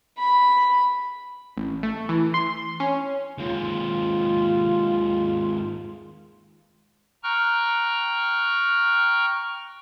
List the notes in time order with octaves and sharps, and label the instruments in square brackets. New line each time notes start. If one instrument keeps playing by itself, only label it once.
[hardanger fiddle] B5
[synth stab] A1
A3
E3
C6
C#4
[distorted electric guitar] D#2 G#2 [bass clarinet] F4
[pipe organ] G5 A#5 C#6 F6 F#6